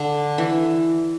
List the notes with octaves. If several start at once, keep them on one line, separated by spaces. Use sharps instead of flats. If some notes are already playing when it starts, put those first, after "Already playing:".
Already playing: D3
E3